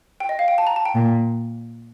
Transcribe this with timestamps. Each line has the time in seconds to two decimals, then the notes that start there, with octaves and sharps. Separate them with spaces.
0.20 G5
0.29 D#5
0.39 F5
0.48 G5
0.58 A5
0.67 A#5
0.76 A5
0.85 G5
0.95 A#2